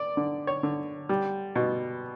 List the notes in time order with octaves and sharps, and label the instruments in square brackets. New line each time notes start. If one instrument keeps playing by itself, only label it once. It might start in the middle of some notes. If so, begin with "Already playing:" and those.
Already playing: [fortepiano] D5
D3
C#5
D3
G3
B2